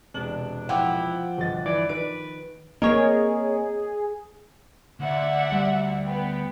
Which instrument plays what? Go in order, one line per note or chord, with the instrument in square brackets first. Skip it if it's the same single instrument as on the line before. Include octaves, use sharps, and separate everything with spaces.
[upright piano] E1 C3 F#7 [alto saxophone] D4
[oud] F3 [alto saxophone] E4 [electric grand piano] F#5 G5 D6
[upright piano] G1 D#5 A6
[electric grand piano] E3 [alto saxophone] D5
[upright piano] D#3 [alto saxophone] B4 [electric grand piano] D7
[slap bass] A#3 C4 [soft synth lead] G#4 [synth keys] A#4 C#5 [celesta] D#5
[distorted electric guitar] D2 [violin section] D5 E5 F#5
[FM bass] G3
[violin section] B3 G5